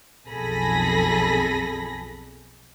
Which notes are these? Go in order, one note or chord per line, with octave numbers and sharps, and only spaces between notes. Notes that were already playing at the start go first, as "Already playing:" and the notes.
B1 F2 G#4 A4 B5 A#6